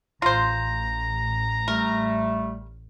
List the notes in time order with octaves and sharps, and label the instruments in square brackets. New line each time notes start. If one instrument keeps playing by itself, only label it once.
[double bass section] A1 [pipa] F4 C5 [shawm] A#5
[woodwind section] G3 A3 [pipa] A#4